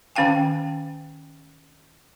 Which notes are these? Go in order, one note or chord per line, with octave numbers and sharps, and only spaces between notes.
D#3 C#4 F5 G5 G#5